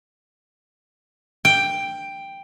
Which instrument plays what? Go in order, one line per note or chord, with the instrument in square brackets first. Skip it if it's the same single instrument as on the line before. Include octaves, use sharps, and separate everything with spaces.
[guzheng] G5